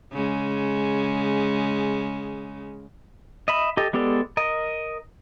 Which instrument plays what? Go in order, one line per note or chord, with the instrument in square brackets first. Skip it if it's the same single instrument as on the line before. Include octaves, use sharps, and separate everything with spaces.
[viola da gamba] C#3 G#3
[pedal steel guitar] D#5 E5 B5
G4 A4 D#5
G#3 B3 G4 A4 D5
A#4 D#5